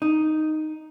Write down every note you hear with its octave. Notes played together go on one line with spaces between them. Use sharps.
D#4